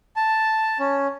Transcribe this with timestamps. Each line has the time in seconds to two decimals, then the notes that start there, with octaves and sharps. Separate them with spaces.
0.16 A5
0.79 C#4